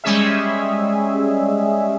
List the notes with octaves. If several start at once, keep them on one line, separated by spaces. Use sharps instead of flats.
G3 G#3 C#4 G#4 E5